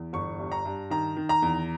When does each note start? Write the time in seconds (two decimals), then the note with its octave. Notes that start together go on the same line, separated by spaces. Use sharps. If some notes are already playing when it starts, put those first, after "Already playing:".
Already playing: E2
0.13 G1 C#6
0.39 G2
0.52 A#5
0.65 G2
0.90 D#3 A#5
1.16 D#3
1.29 A#5
1.42 E2